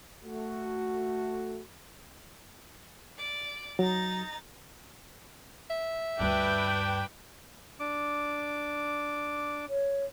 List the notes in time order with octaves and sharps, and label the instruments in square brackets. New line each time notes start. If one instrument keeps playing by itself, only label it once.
[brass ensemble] A3 F#4
[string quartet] D5
[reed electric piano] F#3 [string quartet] D#4 A#5 A6
[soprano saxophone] E5
[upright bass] D2 G2 [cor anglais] D4 [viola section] B4 G5
[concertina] D4 D6
[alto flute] C#5